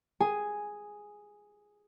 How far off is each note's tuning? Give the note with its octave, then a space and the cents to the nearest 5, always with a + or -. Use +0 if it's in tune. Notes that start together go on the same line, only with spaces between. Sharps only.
G#4 +0 G#5 +0